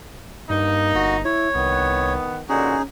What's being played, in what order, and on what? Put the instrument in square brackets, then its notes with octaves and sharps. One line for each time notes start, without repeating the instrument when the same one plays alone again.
[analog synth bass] G2 [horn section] A#3 D#4
[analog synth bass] G1 [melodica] F#4
[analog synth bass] E4 [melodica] C#5
[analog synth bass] C2 [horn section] D#3 B3
[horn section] A#2 D3 F#4 [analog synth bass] C#4 [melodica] D#4 G#4